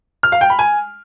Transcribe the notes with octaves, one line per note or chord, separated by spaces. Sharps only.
F6
F5
G5
B5
G#5